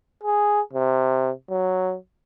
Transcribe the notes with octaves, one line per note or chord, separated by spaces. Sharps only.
G#4
C3
F#3